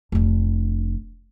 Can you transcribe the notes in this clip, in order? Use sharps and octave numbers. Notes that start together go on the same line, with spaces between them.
F1 D4